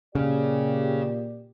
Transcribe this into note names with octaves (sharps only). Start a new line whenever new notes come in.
A#2 C#3 G4 D5